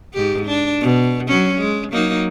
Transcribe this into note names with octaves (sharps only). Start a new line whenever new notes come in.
G#2 G4
D4
B2
F#3 C#4
G#3
F#3 A#3 D#4